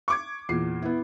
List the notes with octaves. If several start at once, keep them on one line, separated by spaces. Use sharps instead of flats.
C#6 D6 G#6
E2 A#2 C7
B3 E4